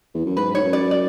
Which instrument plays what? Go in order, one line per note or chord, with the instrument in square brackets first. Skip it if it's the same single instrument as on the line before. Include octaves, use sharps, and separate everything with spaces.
[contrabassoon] E2
F#2
[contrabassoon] G#2 [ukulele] B4
[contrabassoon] G#2 [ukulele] C#5
[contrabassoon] F#2
[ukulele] D5
D5